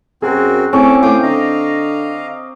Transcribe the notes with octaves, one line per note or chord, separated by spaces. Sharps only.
F#2 C4 F#4 G#4 A#4
A2 C4 C#4 A4 A5 D6
A2 F5 G5 D6 D#6
D3 D#5 F5 A#5